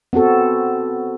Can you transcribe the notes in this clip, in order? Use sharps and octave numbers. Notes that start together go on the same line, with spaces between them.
B3 C4 F#4 A4